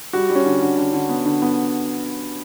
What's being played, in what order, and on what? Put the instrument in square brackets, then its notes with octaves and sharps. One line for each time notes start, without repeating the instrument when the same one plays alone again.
[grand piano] G3 F#4
G3
C#4
D3
D3
D3
D3
B3
D3
B3